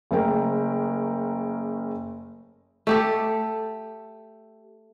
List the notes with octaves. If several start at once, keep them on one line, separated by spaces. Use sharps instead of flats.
F#1 C#3 A3 A#4 G5
A3 G4 A4